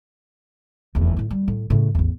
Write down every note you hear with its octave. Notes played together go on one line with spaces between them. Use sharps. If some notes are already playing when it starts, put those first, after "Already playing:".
F1 E2
A2 E4
G3
A2
A2 C#3
A1 E2